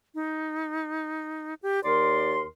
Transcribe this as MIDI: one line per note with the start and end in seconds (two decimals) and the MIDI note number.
0.15 1.54 63
1.62 1.82 67
1.83 2.43 39
1.83 2.43 70
1.83 2.34 74
1.83 2.43 84